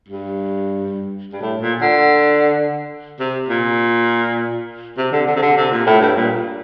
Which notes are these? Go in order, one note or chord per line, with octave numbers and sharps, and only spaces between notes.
G2
G2
A2
A#2
D3
C3
A#2
C3
D3
D3
C3
D3
C3
A#2
A2
G2
A#2